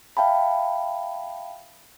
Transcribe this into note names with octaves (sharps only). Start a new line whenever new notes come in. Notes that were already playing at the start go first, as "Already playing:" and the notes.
E5 F5 G5 A5 B5